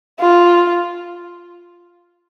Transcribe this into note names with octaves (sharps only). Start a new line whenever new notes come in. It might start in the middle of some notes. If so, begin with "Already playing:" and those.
F4